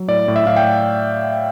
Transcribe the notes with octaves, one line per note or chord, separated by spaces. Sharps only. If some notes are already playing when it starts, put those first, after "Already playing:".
Already playing: F#3
A2 D5
A2
E5
A2 F5
G5